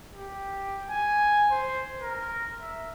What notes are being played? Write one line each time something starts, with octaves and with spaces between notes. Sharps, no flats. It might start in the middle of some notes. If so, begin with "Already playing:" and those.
G4
G#5
C5
A#4
E5